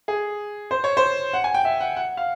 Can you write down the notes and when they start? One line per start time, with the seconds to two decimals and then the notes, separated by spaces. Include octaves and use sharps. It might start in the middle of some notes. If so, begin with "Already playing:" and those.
0.08 G#4
0.71 C5
0.84 C#5
0.97 C5
1.33 F#5
1.44 G#5
1.54 G5
1.65 E5
1.80 F#5
1.96 F#5
2.17 F5